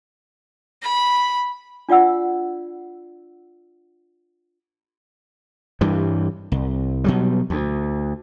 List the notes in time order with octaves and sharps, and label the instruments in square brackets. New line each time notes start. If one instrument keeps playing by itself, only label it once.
[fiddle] B5
[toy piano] D4 F4 D5 F#5 E6
[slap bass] G2 E3 G3
C2
B2 F#3 G3
D2